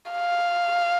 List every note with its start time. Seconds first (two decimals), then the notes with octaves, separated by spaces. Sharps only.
0.11 F5